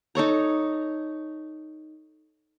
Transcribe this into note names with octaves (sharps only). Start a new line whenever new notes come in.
D#4 A4 C#5 A#5